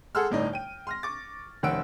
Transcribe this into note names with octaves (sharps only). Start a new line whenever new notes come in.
G#4 A4 F#5 C6 E6 F6
G1 A2 D4 D#4
G5 D#7
C6 F6 A#6
C#6 D6 A6
F1 D#3 C#4 F#5 E6 D7